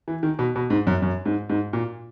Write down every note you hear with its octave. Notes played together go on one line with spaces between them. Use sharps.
E3
D#3
B2
B2
G#2
F#2
F#2
G#2
G#2
A#2